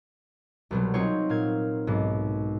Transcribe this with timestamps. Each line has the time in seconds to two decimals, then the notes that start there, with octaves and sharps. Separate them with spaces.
0.71 C2 B2 F#3
0.94 F#3 C4 D#4 F4 C5 C#5
1.29 A#2 F5 G#6
1.87 B1 G#2